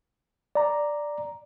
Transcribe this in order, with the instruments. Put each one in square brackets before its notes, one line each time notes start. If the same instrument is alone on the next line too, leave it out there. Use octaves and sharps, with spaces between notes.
[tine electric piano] D5 A#5